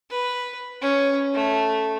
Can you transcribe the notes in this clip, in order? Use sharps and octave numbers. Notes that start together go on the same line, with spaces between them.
B4
C#4
A3